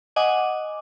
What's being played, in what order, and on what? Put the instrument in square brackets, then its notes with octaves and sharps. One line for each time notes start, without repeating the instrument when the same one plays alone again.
[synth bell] D#5 F#5 G#5 D6 D#6